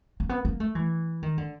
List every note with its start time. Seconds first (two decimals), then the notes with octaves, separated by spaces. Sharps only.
0.20 A#3
0.29 B3
0.45 A#3
0.60 A3
0.75 E3
1.22 D#3
1.38 D3